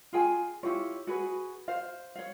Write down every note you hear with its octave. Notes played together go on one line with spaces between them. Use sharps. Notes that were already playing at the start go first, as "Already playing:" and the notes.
F4 G#4 G5 G#5
E4 F4 G4 C#5
F#4 G#4 B4
C5 F5
C#5 F5